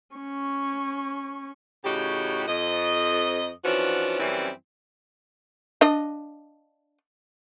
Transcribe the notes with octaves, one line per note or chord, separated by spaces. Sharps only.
C#4 C#6
A2 C#3 D#4 F#4 G4
F2 D#5
E3 F3 C#4 D4 F#4
F#2 E3 G3 C4 C#4 E4
D4 D#5